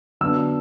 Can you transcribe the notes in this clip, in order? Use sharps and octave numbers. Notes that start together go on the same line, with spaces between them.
D3 F#3 B3 D4 E6